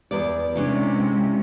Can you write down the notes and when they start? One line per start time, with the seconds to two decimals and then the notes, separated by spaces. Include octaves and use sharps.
0.11 E2 D5
0.55 C3 E3 G#3 C#4 D4